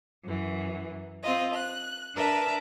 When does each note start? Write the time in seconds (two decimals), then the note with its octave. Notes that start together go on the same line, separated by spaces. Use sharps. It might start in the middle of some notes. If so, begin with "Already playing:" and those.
0.23 F#2 E3
1.23 C4 F4 D#5
1.54 F#6
2.14 D4 A#4 B4 E5 A5